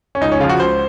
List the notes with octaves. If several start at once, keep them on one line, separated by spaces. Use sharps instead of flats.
C#4
C#2 D#4
C#4
C#3 F3 F4
F#4
C#2 C5